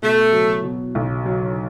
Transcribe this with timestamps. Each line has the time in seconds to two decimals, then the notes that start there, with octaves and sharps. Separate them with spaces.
0.02 B2 A3
0.33 F#3
0.63 B2
0.95 B1
1.26 F#3